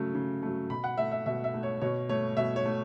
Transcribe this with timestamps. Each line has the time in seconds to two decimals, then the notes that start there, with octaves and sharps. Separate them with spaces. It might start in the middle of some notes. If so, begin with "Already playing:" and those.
Already playing: C#3 F#3 A3
0.15 C#3
0.43 F#3 A3
0.70 B2 B5
0.84 F#5
0.97 A3 E5
1.12 E5
1.26 B2 E5
1.44 E5
1.54 A3
1.63 C#5
1.81 B2 C#5
2.09 A3 C#5
2.37 B2 E5
2.56 C#5
2.66 A3